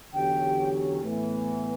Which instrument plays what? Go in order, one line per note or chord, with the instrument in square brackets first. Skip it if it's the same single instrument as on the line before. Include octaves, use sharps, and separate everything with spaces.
[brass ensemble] E2 D3 F#3 C#4 G4 [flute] G5
[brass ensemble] A2 E3 B3